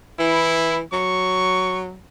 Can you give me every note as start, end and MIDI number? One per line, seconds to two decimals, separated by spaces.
0.19 0.82 52
0.19 0.79 64
0.93 1.98 54
0.93 1.79 85